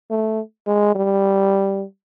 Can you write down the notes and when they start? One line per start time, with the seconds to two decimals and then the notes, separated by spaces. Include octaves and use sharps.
0.11 A3
0.67 G#3
0.95 G3